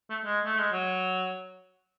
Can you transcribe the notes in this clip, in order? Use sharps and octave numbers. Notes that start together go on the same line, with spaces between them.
A3
G#3
A3
G#3
F#3